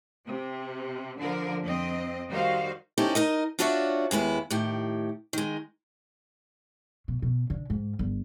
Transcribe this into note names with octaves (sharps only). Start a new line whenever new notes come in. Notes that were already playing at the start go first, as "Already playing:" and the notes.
C3
D3 F3 A#4
F2 C4 D#5
D#3 G3 F#4 C5 F5
C3 C#4 D#4 E4 G4 A4
D#4 A#4 D#5
D4 F4 F#4 C#5 D5 E5
D#2 G#3 B3 E4
A2 D#3 G4
D#3 G#3
B2
B2
D3
G#2
G1